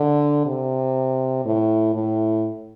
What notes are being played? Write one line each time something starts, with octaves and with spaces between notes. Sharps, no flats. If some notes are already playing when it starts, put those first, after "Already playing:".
Already playing: D3
C3
A2
A2